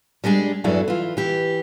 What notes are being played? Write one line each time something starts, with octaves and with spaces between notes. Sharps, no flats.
G3 G#3 D4 G#4
E2 G2 F#3 E4 G#4 A4
E3 F4
E3 G4